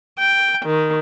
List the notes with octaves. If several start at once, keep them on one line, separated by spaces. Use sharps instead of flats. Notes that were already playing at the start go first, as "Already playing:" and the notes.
G5
D#3